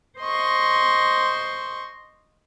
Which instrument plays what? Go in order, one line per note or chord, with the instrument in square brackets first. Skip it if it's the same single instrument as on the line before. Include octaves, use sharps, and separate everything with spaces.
[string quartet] C5 D#5 C6 C#6